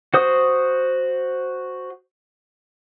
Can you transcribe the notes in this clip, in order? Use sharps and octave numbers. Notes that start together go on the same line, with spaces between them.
F#4 C5 D#6